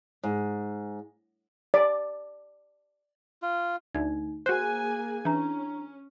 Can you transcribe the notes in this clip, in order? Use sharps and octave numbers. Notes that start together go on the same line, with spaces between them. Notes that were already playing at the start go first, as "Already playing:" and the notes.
G#2
D5
F4
D2 D#4
A#3 F#4 G#4 C5 G#5 F#6
E3 C#4 D4 A#5